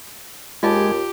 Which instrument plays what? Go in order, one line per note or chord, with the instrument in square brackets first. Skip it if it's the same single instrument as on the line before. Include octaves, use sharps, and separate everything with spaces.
[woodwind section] D#2 [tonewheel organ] G#3 [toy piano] F4 D#5 A5 [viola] G4